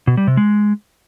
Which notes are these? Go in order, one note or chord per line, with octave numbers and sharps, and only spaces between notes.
B2
G3
C3
G#3